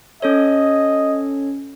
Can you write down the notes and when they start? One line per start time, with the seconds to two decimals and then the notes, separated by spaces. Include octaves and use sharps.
0.22 C#4 A4 C#5 D#5